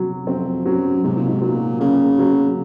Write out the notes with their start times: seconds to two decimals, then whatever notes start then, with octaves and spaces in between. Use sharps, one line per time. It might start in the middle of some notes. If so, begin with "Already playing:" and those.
Already playing: C3 F#3
0.27 F2 C4
0.65 F#2 F#3
1.04 G#2 C3
1.16 A#2
1.28 G#2
1.42 A#2 F#3
1.80 C#3 A#3
2.19 F#3